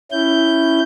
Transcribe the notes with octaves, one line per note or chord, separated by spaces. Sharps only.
C#4 E4 G6